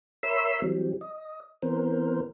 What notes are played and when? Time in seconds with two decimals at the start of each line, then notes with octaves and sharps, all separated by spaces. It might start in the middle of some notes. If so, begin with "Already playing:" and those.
0.23 A#4 C#5 E5 B5 C6 E6
0.62 E3 F#3 G3 C4
1.01 D#5
1.62 E3 B3 C4 A#4 C5